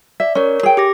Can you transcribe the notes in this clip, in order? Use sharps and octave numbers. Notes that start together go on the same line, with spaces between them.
D5 E5
C#4 A#4 C#5
G#4 G5
G4 D6 A#6